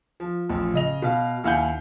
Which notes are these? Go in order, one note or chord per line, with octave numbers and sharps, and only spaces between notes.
F3
A1 F3
C#3 D#5 F7
B2 F5
D#2 E4 F5 F#5 G#5 G6